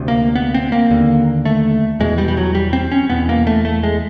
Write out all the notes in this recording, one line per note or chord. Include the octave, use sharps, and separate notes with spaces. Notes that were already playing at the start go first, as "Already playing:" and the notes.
Already playing: D2 C3
A#3
B3
C4
A#3
D#2 D3
A3
E2 B2 G#3
G3
G3
F#3
G3
C4
C#4
E2 B2 B3
A#3
A3
A3
G#3